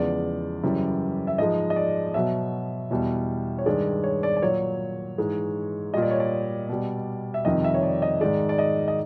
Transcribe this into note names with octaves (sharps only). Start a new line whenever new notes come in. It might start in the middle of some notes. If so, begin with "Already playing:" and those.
Already playing: E2 C#3 F3 G#3 D5
F#2 C#3 E3 G3
E5
G#2 F3 G#3 D#5
D#5
D5
B2 F#3 E5
E2 B2 G3
C#5
G2 D#3 G#3 D5
C#5
D5
D5
A#2 F#3 C#5
G#2 E3 G#3
A#2 G3 D#5
D5
C#5
D5
B2 G3
E5
F2 C3 D#3 G3 D#5
E5
C#5
D5
D#5
G#2 D#3 G#3 D5
D5
D#5
D#5